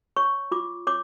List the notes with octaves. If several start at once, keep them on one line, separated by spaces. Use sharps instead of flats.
C#5 C#6
F4 D6
C#5 D6